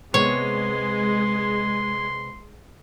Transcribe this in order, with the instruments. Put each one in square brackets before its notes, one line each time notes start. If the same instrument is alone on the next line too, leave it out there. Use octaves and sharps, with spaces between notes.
[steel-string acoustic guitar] C3 B3 D5 [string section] G#3 [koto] C#5 [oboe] C6